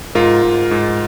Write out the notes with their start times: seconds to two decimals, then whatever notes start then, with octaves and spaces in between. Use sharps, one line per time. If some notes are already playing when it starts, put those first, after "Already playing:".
0.15 G#2 F4 A#4
0.43 G#2
0.71 G#2